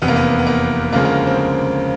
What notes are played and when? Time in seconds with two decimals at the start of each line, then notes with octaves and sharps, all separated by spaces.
0.02 F1 E2 C3 B3
0.08 A#3
0.16 B3
0.39 B3
0.46 A#3
0.93 D2 C#3 F3 G#3 A#3
1.05 A#3
1.27 C4
1.38 C4